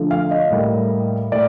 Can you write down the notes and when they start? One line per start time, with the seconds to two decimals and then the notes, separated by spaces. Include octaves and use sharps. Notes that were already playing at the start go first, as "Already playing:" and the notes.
Already playing: D3 F3 A3
0.11 F5
0.31 D#5
0.51 A2 G3 A#3
1.32 A2 D5